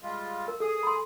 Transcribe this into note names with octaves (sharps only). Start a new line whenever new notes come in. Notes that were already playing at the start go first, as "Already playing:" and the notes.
G3 G#3 F4
A#4
G#4 A4 D#6
B5 C6